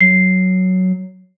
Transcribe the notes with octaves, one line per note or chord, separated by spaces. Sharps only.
F#3 C7